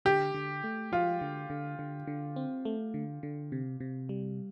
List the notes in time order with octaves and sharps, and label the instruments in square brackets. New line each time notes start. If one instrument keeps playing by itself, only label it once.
[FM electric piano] D3 [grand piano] G4
[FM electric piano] D3
A3
[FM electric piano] F3 [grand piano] F4
[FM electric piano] D3
D3
D3
D3
C4
A3
D3
D3
C3
C3
G3